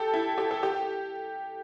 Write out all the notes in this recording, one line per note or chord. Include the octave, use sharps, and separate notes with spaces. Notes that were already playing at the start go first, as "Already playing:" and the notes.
Already playing: G4 A4
E4
G4
A4
G4